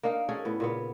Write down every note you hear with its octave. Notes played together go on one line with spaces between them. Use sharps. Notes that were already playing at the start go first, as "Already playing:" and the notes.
A#3 D4 D#4 F5
C#4 F#4 G#4 A4
A2 B3
A#2 C#3 B3